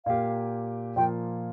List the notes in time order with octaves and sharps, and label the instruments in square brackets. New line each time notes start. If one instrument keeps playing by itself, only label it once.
[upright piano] A#2 A#3 G4 [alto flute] F5
[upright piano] A#2 F3 A#3 F4 [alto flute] G5